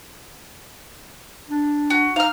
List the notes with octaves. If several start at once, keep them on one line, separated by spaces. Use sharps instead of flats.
D4
F#4
D#4 F5 F6